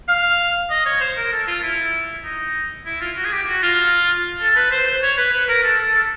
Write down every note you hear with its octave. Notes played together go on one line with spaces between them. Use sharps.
F5
D#5
C#5
C5
A#4
A4
F4
E4
D#4
E4
F4
F#4
G#4
G4
F#4
F4
A4
B4
C5
C5
C#5
B4
B4
A#4
A4
A4
A4